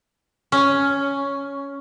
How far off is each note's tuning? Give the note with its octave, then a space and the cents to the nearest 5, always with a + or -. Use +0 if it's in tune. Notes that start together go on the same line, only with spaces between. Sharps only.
C#4 +5